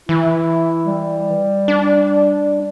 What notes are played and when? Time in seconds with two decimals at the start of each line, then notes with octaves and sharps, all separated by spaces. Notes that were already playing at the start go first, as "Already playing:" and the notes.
0.09 E3 E4
0.86 G3
1.68 D4